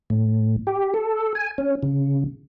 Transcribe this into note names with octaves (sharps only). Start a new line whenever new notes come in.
A2
G4
A4
G#5
C#4
C#3